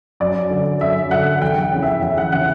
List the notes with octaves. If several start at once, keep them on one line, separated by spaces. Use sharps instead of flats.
F#2 D5
D3
F#2 E5
D3 F#5
E2 G5
F#5
C#3 E3
E5
E2 E5
F#5
C#3 E3 F#5